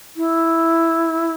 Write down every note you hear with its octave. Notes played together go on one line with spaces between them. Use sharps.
E4